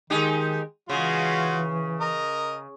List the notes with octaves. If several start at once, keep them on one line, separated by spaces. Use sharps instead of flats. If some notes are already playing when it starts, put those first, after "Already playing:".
D#3 G#3 D#4 G4
C#3 E3 G#3 F4 F#4
A#4 D#5 A#5